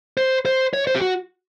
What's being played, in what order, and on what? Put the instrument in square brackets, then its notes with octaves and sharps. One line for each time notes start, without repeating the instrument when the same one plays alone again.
[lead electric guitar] C5
C5
C#5
C5
G4
F#4